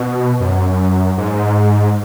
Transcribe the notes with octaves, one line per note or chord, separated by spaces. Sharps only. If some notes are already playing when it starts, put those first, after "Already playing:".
Already playing: B2
F#2
G#2